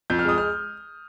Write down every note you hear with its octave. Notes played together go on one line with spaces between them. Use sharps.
F2 G6
F6
G#3 D#6
F6